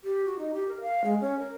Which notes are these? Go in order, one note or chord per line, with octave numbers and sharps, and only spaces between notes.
G4
F#4
D#4
G4
A#4
F5
G#3
C#4
A#4